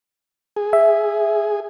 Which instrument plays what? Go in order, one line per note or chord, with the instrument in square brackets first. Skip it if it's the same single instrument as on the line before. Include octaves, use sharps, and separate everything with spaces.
[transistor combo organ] G#4
[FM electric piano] E5